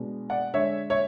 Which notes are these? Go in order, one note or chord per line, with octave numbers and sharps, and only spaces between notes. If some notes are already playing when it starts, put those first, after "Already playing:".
Already playing: B2 G#3 B3 D4
D5 F#5
D3 G#3 D4 C#5 E5
C#5 E5